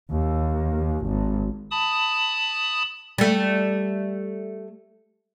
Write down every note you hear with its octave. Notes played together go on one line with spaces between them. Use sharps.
D#2
G#1
A5 B5 D#6
G3 A3